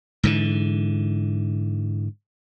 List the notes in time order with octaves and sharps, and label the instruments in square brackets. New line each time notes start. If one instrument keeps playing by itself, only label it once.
[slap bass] G#2 D3 E3